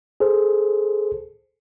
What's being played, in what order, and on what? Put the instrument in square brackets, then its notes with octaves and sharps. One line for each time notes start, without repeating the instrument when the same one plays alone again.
[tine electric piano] G#4 A4 C5